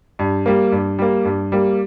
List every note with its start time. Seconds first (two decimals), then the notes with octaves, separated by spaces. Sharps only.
0.19 G2
0.46 G3 A#3
0.72 G2
0.98 G3 A#3
1.25 G2
1.52 G3 A#3